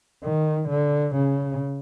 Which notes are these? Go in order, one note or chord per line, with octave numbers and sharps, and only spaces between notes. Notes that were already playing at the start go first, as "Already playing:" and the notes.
D#3
D3
C#3